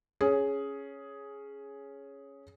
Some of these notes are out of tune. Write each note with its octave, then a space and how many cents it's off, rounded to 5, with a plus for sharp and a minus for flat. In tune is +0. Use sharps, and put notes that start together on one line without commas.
C#4 +0 G#4 +5